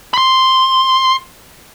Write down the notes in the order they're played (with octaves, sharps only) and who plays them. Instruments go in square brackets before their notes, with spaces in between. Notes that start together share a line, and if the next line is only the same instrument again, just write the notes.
[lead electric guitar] B5 C6